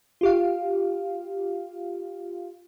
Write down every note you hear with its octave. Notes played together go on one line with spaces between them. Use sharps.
F4 G4 F5